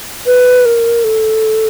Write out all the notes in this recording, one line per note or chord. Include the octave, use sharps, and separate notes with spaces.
B4
A#4
A4